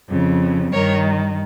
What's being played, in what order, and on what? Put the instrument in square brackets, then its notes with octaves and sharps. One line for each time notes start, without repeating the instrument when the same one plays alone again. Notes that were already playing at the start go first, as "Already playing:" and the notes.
[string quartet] F2 C#3
G2 D#3 A#4 C#5